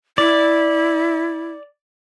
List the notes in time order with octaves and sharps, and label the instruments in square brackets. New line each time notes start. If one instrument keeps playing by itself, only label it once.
[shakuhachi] E4 [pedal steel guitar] D5